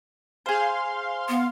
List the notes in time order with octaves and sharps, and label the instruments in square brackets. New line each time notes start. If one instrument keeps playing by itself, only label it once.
[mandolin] G#4 C5 [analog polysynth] F5 C6
[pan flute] B3